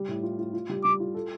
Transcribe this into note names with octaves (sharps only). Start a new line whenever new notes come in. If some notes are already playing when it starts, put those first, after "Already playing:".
Already playing: G3
A2
F4
F4
F4
G3
G3 D6
F4
A4